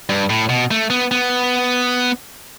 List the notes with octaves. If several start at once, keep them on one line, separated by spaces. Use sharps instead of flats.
G2
A2
B2
A3
B3
B3